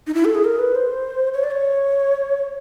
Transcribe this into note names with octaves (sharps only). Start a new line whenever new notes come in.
D#4
E4
A4
G#4
A#4
B4
C5
C#5
D5
C#5